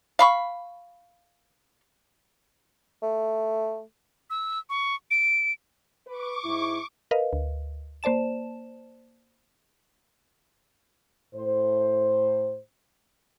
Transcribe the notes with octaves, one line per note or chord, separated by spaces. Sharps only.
F5 B5 C#6
A3
E6
C#6
D7
B4 C#6 D6
G#2 E4
A#4 B4 D#5 F5
D2
A#3 C5 D5 A5 E7
A2 C5